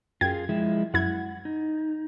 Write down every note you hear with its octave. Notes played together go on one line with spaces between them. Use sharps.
F#2 F4 G#4 G5 G#6
F3 G#3 E4
F#2 E4 F#5 G#6
D#4